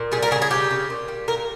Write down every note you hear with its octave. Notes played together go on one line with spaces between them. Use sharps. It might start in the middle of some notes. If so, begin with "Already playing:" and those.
Already playing: A#2
G3 G#4
A#4
C#3 G#4
G#4
C#3 G4
C#3
A#2
G3
A#2 A#4